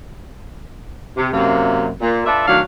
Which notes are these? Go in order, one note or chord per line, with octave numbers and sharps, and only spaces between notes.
C3
F#2 C3 A#3
A#2
D4 F4 A4 B4 D5 E5
A2 D#3 F#3 D4 D5 F5